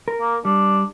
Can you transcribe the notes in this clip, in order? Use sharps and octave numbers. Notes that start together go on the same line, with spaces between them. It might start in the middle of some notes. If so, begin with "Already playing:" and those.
A#4
A#3
G3 D4